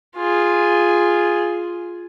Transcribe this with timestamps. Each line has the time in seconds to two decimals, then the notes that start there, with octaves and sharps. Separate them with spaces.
0.17 F4 G#4